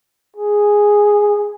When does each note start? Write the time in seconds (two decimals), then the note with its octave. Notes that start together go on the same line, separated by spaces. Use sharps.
0.36 G#4